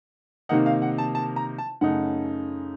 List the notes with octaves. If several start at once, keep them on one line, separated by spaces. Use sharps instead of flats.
C3 D#3 A#3 D#4 F#5
F5
F#5
A5
A5
A#5
A5
F#2 C#3 A3 D#4 F#5